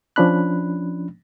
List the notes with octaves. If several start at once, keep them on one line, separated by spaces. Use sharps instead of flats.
F3 C#4 D4 B5 F#6